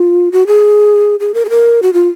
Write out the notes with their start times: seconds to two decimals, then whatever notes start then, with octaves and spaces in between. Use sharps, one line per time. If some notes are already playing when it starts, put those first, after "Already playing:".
Already playing: F4
0.32 F#4
0.47 G#4
1.20 G#4
1.34 A#4
1.45 G#4
1.50 A#4
1.82 F#4
1.93 F4